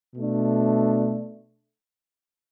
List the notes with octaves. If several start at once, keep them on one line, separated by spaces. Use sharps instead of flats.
B2 A3 D4